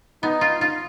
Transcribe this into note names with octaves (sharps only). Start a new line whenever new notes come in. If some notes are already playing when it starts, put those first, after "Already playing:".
B3 D#4
F4
F4